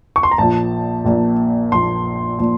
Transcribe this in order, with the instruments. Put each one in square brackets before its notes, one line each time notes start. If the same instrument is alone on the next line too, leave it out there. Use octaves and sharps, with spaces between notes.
[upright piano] C#6
C6
A#5
A#1 A#2 F3 A5
A#1 A#2 F3
A#1 A#2 F3 C6
A#2 F3